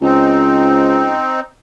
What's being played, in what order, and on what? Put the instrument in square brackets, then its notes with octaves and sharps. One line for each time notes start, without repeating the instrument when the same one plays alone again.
[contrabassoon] C#2 [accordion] C4 D#4